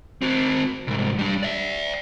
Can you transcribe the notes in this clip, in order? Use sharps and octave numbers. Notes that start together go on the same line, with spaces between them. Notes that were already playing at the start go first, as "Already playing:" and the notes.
C4 F#4
C2 G#2
G3 D4
D5 E5